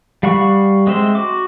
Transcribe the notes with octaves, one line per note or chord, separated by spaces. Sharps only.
G3 F5 F#5 B5 C#6
G#3 C4 E5 C6
F#4 D6